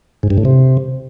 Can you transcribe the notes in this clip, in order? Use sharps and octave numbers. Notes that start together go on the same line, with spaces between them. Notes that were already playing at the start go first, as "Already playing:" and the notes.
G#2
G2
A2
C3